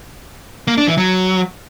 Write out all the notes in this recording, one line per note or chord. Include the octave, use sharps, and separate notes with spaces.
A#3
D4
E3
F#3